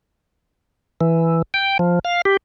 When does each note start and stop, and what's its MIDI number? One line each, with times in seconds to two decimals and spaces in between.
1.01 1.42 52
1.54 1.78 79
1.79 1.99 53
2.05 2.22 77
2.25 2.37 67